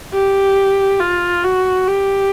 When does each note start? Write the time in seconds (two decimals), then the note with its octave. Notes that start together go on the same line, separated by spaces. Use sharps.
0.13 G4
1.00 F4
1.44 F#4
1.87 G4